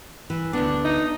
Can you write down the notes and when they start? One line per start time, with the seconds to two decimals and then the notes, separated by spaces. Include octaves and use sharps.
0.30 E3
0.53 D2 B3 D4
0.85 D#4